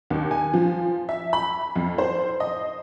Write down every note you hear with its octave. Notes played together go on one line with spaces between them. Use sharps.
D#2
G#5
F3
E5
B5
F2
C5
D#5